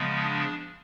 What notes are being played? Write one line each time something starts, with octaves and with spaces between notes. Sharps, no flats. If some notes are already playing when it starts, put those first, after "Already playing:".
Already playing: C#3 F3 G#3 B3
D4